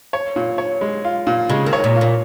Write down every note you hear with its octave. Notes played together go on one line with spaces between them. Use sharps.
C#5
A#2
C#5
G#3
F4
A#2
C#3 G#3
D#3
C#5
A#2
F4
A#2